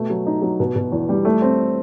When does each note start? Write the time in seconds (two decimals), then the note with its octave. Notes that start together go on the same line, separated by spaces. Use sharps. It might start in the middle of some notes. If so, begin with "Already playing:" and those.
Already playing: B2 A3
0.10 F#3
0.26 D#4
0.42 F#3
0.60 B2
0.76 B2
0.92 E2
1.09 G3
1.25 A3
1.42 C4